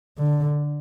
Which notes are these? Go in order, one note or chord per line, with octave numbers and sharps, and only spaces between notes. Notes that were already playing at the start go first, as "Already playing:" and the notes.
D3